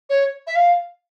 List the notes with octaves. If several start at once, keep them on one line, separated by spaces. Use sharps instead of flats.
C#5
E5
F5